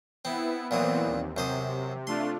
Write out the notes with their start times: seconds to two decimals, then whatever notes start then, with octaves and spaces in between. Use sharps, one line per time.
0.25 B3 C4 E4
0.71 A#2 E3 F#3 B3 C4 D#6
1.06 D#2
1.37 F#2 C3 C5 D#6
2.07 A3 D4 F4 C6